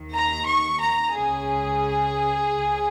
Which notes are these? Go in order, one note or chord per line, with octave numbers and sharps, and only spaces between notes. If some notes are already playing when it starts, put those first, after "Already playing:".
Already playing: D#2 D#3
A#5
C#6
A#5
C#2 C#3 G#4
C#2 C#3